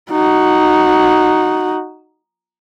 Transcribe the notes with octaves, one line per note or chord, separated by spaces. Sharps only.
D#4 F#4